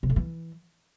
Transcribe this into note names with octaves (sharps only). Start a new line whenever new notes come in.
C3
A2
E3